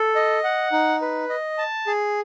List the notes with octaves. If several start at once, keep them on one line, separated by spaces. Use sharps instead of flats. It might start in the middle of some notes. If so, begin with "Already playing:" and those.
Already playing: A4
D#5
F#5
D#4
B4
D#5
A5
G#4